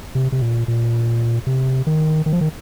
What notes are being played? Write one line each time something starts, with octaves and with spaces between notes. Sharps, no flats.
C3
C3
A#2
A#2
C3
D#3
D#3
F3
D#3